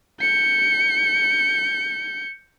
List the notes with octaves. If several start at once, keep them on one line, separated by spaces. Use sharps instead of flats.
G6 C#7